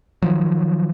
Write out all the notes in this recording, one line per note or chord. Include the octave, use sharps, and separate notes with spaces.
D#3 F3 F#3